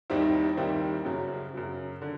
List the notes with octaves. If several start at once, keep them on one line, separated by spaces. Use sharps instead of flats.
D#2 D#3 G3 C4 E4
D#2 D#3 G3 C4 E4
F#2 C#3 F#3
F#2 C#3 F#3
D3